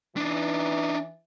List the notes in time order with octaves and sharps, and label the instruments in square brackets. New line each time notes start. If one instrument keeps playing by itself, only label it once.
[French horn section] E3 [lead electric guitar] D4 D#4